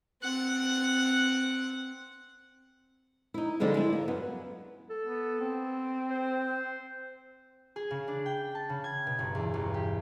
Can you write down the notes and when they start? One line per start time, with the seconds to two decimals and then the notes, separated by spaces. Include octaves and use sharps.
0.22 C4 F#5
3.34 D#4 E4
3.60 D3 F3 G3 G#3 A#3
3.74 G#3 E4
3.92 A#3
4.08 F#2 B3
4.90 A4
5.06 B3
5.41 C4
6.10 C5
7.76 G#4
7.91 C#3
8.08 D4
8.26 G5
8.55 A5
8.70 C#3
8.84 G#6
9.06 B2
9.19 G1
9.35 E2
9.54 G1
9.74 G4